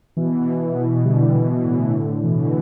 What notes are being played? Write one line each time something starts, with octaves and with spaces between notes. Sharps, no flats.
B2 E3
B2 E3
D3 G3
B2 E3
B2 E3
E3
A2 D3
B2 E3